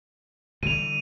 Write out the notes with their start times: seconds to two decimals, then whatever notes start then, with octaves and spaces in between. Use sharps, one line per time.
0.63 D3 E3 G3 D#7 F7